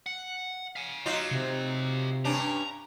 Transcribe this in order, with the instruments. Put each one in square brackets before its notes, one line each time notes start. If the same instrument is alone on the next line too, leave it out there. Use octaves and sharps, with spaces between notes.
[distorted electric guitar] F#5
F5 G#5
[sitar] F#3 D#4 F4 [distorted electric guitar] G4 F5
[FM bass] C3
[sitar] G2 C#4 D4 [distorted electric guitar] A#5